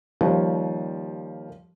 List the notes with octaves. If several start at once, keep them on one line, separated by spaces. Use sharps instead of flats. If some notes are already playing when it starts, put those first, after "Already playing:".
D#2 F3 G3